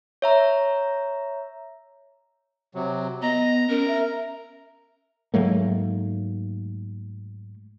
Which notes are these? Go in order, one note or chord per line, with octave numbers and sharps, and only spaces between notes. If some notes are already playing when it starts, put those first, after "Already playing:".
C#5 E5 A#5
C3 F#3
B3 D#5 A#5
C#4 A#4
E5
G#2 F#3 A3 A#3